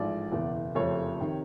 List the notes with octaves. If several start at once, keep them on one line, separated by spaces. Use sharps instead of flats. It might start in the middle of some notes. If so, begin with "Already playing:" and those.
Already playing: A1 G#2 F3 D5
F#1 E2 B2
F#1 F2 C3 F3 A3 C#5
C3 D#3